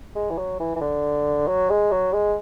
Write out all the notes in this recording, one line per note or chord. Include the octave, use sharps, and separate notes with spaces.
G#3
E3
F#3
E3
E3
D3
F#3
G#3
F#3
G#3